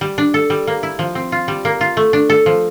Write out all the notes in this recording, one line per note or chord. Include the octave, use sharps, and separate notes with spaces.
G3
D4
A4
G3
A#3
E4
F3
C4
F4
G3
A#3
F4
A3
D4
A4
F3